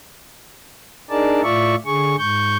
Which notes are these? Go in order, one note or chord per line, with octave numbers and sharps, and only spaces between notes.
D4 D#4 G#4 A#4 D5 A5
A2 F4 D5 E5 C#6
D3 G#4 C#6
G#2 C#6 G6